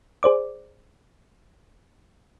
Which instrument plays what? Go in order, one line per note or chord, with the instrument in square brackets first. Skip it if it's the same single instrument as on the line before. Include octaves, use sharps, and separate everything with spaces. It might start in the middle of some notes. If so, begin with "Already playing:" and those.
[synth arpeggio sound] G#4 C5 D5 D6